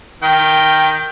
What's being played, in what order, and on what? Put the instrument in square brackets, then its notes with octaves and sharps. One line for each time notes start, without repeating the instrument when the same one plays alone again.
[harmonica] D#3 G5